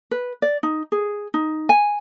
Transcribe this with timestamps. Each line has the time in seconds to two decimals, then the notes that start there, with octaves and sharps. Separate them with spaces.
0.11 B4
0.42 D5
0.63 D#4
0.92 G#4
1.34 D#4
1.69 G#5